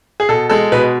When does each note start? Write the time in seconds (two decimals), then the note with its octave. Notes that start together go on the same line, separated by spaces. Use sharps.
0.20 G#4
0.29 B2 A4
0.50 G#3 A4
0.72 B2 B4